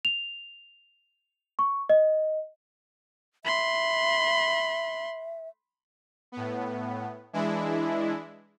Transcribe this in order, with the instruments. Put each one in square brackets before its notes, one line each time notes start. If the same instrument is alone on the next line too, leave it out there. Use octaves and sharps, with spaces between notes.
[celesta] F7
C#6
D#5
[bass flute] E5 [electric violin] B5 C6
[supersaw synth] A2 B3
E3 G#3 D4 E4